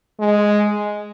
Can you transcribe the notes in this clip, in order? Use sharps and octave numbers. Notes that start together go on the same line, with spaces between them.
G#3